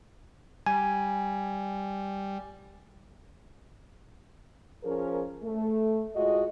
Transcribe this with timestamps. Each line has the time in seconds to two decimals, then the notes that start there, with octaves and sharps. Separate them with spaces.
0.66 G3 G#5
4.84 F3 C#4 G#4 A#4
5.43 A3
6.15 A2 G#3 F4 F#4 D#5